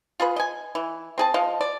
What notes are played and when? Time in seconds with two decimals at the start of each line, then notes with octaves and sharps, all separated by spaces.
0.20 F4 G#4 B4
0.36 D#5 G#5
0.75 E3
1.18 C4 G#4 A5
1.34 F3 D#5 F5
1.61 D5